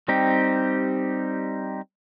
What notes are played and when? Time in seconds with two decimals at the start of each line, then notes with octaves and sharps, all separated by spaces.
0.08 G3 C4 D#4 G4